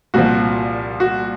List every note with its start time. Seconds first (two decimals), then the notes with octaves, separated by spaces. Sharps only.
0.14 C2 A#2 F3 F#4
1.00 F#4